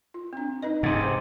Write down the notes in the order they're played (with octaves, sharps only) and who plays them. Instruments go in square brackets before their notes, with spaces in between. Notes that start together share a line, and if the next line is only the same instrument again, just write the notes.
[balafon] F4
C4 D4
D#4 B4 D#5
[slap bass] G#2 C3
[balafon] C5